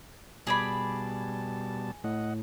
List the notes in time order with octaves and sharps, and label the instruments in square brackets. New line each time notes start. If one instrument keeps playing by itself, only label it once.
[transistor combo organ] B2 G3 A5 [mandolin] G#4 D5 B5
[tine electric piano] A2 [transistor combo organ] D#5 F#5